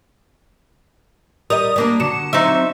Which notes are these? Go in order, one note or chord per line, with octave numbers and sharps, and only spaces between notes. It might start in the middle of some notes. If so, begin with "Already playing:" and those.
G3 A#4 D#5 D#6
G3 A#3 D4
D3 F#3 C#7 E7
F#3 C4 D#4 E5